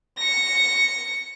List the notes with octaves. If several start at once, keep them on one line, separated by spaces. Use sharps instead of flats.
A#6 C#7